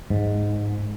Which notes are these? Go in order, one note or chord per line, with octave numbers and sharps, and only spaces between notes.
G#2